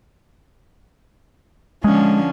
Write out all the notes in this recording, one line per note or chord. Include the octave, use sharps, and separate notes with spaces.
D3 F3 G#3 C#4